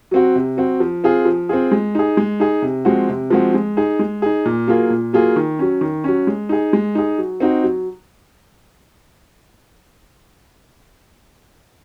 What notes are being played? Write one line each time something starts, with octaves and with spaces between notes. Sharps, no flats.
F#3 C4 F#4
C3
F#3 C4 F#4
F3
C4 F4 G#4
F3
C4 F4 G#4
G#3
D#4 G#4
G#3
D#4 G#4
C3
F3 G#3 C4 F#4
C3
F3 G#3 C4 F#4
G#3
D#4 G#4
G#3
D#4 G#4
A#2
F#3 A#3 F4 G#4
A#2
F#3 A#3 F4 G#4
D#3
F#3 C#4
D#3
F#3 C#4
G#3
D#4 G#4
G#3
D#4 G#4
F#3
C4 D#4 F#4
F#3